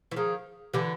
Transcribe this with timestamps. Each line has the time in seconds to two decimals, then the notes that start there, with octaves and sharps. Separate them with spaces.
0.11 E3
0.16 D#3 F3 G#4
0.74 D3 E3 G4